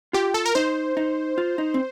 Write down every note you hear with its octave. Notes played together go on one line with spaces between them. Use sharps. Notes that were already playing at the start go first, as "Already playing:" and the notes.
F4 G4
A4
A#4
D#4 C5
D#4
F4
D#4
C4